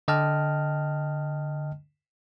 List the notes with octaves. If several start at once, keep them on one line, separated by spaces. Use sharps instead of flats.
D3 D#5 G5 A5 F6